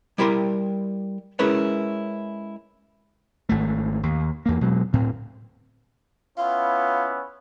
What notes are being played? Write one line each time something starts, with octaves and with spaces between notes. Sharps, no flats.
G3 E4 G4 A#4 C6
G#3 C#4 E4 A#4 B4 C#5
G#1 A3
D#2
E2 A#3
B2 F#3 G#3
D2 A2 C4
B3 C#4 E4 F4